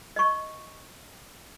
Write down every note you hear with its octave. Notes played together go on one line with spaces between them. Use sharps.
D#5 C#6